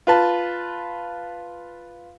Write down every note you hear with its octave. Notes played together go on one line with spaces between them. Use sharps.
F4 B4 A5